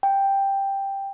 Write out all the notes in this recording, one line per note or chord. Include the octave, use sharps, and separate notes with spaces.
G5